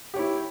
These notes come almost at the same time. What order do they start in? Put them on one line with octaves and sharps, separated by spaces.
G4 C#5 E4